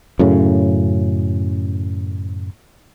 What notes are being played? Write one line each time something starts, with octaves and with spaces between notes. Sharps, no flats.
F#2 A2 C#3